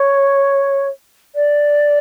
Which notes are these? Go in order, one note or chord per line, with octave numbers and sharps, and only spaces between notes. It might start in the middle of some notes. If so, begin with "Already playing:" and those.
Already playing: C#5
D5